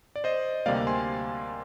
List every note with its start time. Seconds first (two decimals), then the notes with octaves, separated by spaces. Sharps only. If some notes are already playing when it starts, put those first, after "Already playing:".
0.16 D5
0.24 C5 D#5
0.66 D2 C3 G3 A#3 D5 F5
0.87 G#5 C6